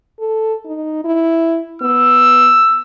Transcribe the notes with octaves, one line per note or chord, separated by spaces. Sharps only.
A4
D#4
E4
B3 E6